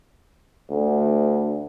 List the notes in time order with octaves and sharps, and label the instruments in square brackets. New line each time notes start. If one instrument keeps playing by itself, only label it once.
[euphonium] D2